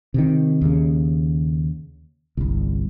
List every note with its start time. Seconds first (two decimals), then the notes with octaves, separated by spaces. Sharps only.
0.14 C3 D#3
0.61 D#2 C#3
2.37 G1 C2